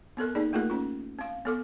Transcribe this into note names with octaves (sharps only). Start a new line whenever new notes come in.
B3 C4 A4 A#4
A#3 D#4 G#4 D5
A3 A#3 F4 G#4 A#4
C#4 F4
C4 F5
B3 A4 D6